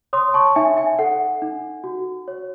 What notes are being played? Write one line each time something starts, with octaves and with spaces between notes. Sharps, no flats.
C#5 C6 D#6
A5 C#6
D#4 E5 G#5
E5 G#5
A4 F#5
D#4
F#4
C#5